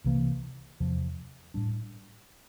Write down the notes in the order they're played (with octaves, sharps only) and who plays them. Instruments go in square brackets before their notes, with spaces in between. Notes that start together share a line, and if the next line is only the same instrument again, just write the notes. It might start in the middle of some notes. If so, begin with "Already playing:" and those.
[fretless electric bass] C2 C3 E3 A#3
E2 C3 F3
A2 G3 D4